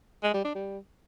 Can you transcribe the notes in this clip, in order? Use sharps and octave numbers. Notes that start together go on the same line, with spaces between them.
G#3
G3
D4
G3